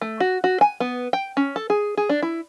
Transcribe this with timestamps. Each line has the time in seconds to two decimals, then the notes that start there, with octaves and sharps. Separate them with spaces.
0.01 A3
0.20 F#4
0.44 F#4
0.61 G#5
0.80 B3
1.13 G5
1.37 C#4
1.56 A4
1.70 G#4
1.97 G#4
2.09 D4
2.22 E4